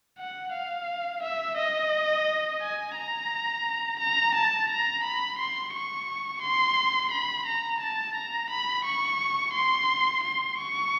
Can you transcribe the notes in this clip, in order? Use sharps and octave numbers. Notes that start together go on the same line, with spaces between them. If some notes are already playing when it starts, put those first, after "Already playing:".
F#5
F5
E5
D#5
G#5
A#5
A#5
A5
A#5
B5
C6
C#6
C6
B5
A#5
A5
A#5
B5
C#6
C6
C6
C#6